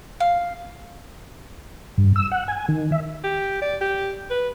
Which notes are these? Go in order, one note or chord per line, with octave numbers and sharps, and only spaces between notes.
F5
G2
E6
F#5
G#5
D#3
E5
G4
D5
G4
B4